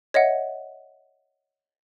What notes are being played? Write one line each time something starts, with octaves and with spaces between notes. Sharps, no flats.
C#5 D#5 E5 F#5